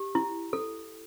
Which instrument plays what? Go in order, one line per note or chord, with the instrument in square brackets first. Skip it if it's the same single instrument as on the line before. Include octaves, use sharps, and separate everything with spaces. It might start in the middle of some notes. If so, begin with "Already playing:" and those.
Already playing: [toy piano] G4
E4
A4